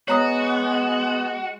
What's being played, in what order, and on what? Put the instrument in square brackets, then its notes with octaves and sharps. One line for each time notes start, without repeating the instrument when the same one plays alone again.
[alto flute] G#3 [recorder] B3 [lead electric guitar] F#4 [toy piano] C#5 A#5 D#6